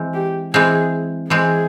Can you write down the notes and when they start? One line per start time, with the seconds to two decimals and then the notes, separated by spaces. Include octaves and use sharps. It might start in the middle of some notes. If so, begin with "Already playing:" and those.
Already playing: E3 G#3 C4
0.14 G4
0.53 E3 G#3 C4 G#4
1.30 E3 G#3 C4 G#4